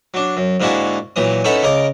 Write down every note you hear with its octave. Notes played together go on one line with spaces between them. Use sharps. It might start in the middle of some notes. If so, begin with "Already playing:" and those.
F#3 D4
F#2
G#2 D3 A#3 E4 F#4 G#4
A#2 E3 F#3 D#6
C#4 D#4 E4 A4 B4 F#5
C#3 A#4 D#5 D6